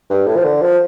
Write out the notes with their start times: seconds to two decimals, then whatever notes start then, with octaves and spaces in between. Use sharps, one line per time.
0.10 G2
0.27 A2
0.36 F3
0.45 D3
0.62 F3